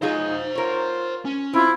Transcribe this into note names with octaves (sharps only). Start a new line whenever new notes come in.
F#3 D#4 F4 G#4 C5 F#5
F4 A#4 C#5
C#4
C4 E4 F4